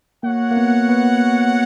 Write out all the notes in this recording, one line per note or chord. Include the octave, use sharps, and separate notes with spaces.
A#3 F#4 C#5 F#5
A#3
B3
B3